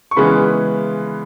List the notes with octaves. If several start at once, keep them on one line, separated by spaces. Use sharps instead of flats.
C#6
C#3 E3 G#3 B3 B5